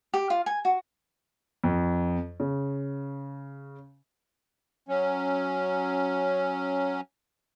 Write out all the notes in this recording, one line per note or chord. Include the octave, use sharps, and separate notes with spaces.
G4
F4
G#5
F#4
F2
C#3
F#3 C#4